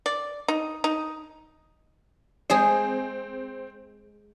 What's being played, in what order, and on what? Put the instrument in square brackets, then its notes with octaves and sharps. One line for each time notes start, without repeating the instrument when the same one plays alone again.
[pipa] D5
D#4
D#4
[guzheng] G#3 G#4 C5 [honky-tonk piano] C4